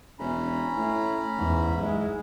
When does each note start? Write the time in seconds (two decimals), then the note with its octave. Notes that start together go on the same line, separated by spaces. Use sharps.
0.19 E1 C#4 A#5 B5
0.76 A2
1.38 E2 G#2
1.80 G#3 E4